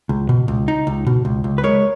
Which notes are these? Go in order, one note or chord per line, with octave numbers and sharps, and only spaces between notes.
C#2
B2
C#2
D#4
C#2
B2
C#2
C#2
B4
G#3 A#4 C#5